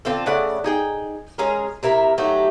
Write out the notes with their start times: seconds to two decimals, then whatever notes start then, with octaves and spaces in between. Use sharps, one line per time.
0.05 D3 C4 F4 A4
0.26 C#3 A3 D5 F#5
0.64 D#4 G#4 G5
1.38 G#3 C#4 G#4 A#4
1.83 C3 E4 A#4 E5
2.18 F#3 A3 D#4 G4